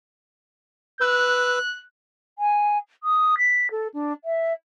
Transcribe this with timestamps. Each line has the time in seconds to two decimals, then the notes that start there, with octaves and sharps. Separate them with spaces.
1.01 B4 E6 F#6
2.38 G#5
3.03 D#6
3.37 B6
3.71 A4
3.93 D4
4.24 E5